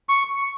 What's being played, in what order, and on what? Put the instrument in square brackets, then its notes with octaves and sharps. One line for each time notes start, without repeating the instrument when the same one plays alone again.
[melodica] C#6